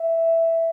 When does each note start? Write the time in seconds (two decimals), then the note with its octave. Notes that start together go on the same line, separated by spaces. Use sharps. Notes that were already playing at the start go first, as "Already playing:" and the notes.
Already playing: E5